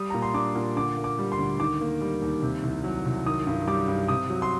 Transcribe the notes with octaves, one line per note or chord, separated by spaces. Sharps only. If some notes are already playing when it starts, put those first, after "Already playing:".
Already playing: G3 D#6
A#2 A#5
C6
D4 D6
A#2
D3 D6
A#3
D6
G3
C6
D2
D#3 D6
A#3
G3
D#2
C3
C2
F#3
C2
D#3 D#6
G2
G3 D6
G2
C3 D#6
F#3
C6